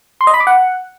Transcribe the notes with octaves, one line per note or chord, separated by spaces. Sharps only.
C6
D#5
B5
D6
F#5